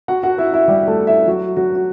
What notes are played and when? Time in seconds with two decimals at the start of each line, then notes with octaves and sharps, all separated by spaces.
0.08 F#4 F#5
0.23 F#4 F#5
0.38 E4 E5
0.53 E4 E5
0.68 G3 G4
0.87 A3 A4
1.07 E4 E5
1.27 F#3 F#4
1.57 F#3 F#4
1.75 F#4